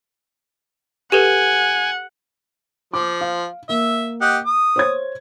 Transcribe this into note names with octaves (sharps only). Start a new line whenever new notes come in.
G4 A4 B4 F#5 G#5
F3 D6
F5
A#3 E5
G4 D#5 F#5
D#6
C5 C#5 G#6